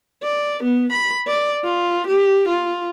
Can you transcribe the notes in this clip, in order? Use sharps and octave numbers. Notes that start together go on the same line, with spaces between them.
D5
B3
B5
D5
F4
G4
F4